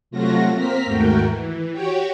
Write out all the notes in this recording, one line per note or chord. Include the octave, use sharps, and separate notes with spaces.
C3 F#3 A3 F4 F#4 A#6
A#3 C4 A#5 F6 B6
D#2 G#2 A3 F#4 A#4 G5
E3
F#4 G4 C#5 G5